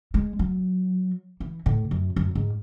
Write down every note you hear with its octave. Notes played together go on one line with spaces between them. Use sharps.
G#3
F#3
E3
A2
F#2
F#2
G#2